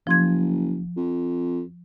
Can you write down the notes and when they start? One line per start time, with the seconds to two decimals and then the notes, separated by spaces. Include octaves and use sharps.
0.07 F#1 F3 C6 G#6
0.97 F2